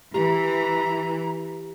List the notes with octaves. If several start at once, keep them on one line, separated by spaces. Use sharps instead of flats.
E3 G4 A#5